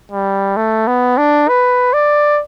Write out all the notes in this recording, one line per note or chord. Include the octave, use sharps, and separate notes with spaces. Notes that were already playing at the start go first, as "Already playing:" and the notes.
G3
A3
B3
D4
B4
D5